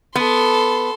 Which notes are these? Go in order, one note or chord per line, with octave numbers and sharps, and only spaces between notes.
B3 A4 C6